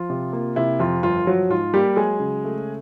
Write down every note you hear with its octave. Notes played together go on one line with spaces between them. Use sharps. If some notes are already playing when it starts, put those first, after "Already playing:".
Already playing: F3 F4
C3
A#3
C3 E4
F2 F4
G1 F4
F3 F#3 F#4
G#2 F4
G3 A#3 G4
F#3 G#3 G#4
C#3
A3